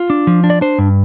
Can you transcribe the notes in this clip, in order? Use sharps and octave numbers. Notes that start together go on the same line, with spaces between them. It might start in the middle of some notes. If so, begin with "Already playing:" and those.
Already playing: F4
D4
F3
D4
D5
D4 C5
G2